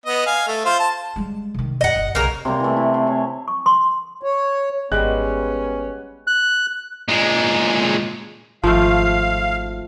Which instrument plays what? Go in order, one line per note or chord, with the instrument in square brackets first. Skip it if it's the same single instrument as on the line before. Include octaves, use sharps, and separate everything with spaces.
[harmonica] B3 D#5
F5 G#5
A3
F4 C5
A5
[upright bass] G3 G#3
C3 D#3
[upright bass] F2 A#2 [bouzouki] D#5 F#5
[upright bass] F#1 E4
[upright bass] B1 [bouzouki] C#3 A#3 A#4
[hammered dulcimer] C3 G3 A#3 C4
E3 A3
E4
C6
C#5
[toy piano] C#6
C6
[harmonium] C#5
[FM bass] G#1 [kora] G3 G#3 [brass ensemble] B3 C#4 [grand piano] F#6
[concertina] F#6
[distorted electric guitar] A#2 G#3
[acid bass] G#1 [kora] F3 A3 [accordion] F5